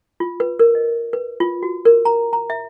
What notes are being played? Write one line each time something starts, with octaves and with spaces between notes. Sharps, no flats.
F4
B4
A#4
D#5
B4
F4
F#4
A#4
A#5
A#5
E5